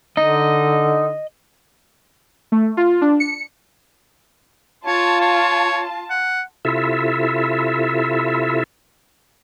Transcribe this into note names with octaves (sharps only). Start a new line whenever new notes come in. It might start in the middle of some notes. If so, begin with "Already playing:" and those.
D3 D#4 D#5
A3
F4
D4
C#7
F4 C#5 A5
C#5
F#5
C3 E4 F4 A4 E5